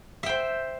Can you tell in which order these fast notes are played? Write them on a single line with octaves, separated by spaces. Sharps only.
E5 G5 C5